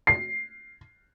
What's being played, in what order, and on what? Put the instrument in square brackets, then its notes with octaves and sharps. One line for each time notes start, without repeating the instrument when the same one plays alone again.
[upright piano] C7